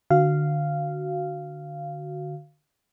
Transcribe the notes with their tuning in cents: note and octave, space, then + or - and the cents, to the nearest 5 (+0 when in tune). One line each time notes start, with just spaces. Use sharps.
D3 +20 F#4 +0 F5 -10